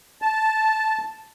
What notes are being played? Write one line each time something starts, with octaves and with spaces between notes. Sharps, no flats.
A5